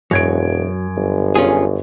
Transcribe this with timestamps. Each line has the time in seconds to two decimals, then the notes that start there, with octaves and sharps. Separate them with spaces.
0.11 E1 F#2 F#3 G#6 D7
0.96 G1
1.35 C#4 F4 G#4